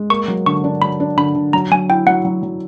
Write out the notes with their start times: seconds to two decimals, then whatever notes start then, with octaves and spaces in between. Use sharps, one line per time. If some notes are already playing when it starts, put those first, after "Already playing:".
Already playing: G#3
0.10 A#3 C#6
0.28 F#3
0.46 D3 C#6
0.64 D4
0.82 F#3 B5
1.00 D4
1.17 D3 B5
1.35 D3
1.53 F#3 A#5
1.71 F#3 G#5
1.89 E4 G5
2.07 F#3 F#5
2.25 F#3
2.43 F#3